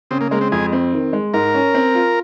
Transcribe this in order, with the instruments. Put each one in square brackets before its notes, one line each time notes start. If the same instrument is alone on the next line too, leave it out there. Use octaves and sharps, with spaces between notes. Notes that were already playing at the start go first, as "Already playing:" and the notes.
[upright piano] C#3 [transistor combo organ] C4
[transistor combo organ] A#3
[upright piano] G#3 [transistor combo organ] A#3
[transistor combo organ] C4
[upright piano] F2 [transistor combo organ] G#4
[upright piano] C4
D#3
G#3
[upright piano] G#2 [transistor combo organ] A#4
[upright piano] C#4
C4
F4